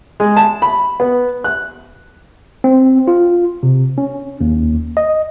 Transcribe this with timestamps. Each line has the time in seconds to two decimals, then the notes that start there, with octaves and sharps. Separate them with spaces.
0.20 G#3
0.37 A5
0.62 B5
1.00 B3
1.44 F#6
2.64 C4
3.08 F4
3.63 C3
3.98 C#4
4.41 D#2
4.97 D#5